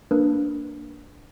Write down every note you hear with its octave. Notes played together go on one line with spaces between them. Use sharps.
A#3 D4 A#4 B4